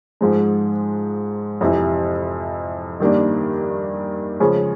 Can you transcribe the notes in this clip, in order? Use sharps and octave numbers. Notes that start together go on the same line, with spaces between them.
G#2 F3 G#3
F2 C3 E3
G2 D#3 G3 A#3 D4
C#3 F3 G#3 C#4